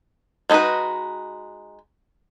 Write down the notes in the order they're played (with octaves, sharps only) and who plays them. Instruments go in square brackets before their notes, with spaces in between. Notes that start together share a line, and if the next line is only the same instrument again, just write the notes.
[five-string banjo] G#3 D#4 E4 F#4 B4